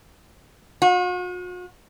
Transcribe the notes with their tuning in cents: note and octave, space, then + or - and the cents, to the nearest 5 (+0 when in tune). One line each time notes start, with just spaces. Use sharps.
F#4 -45